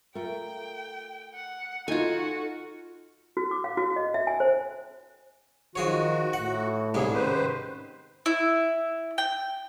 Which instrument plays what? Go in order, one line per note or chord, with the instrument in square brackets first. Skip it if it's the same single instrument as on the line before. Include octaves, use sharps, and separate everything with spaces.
[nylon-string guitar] A3 F4 A#4 [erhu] G5
[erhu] F#5
[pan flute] D#4 [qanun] F4 G#5 [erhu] F#4 [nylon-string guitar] A4 D#5
[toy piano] F#4
D6
F5
F#4
D#5
E5
G#5
C5
[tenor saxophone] D#3 [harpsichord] F3 G#4 C#5 [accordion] F#4
[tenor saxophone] A2 [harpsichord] F#5
[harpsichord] C2 G#2 G3 [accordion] C#3 G#4
[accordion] D#3 B4 C5 [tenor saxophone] C#4
[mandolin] E4
G5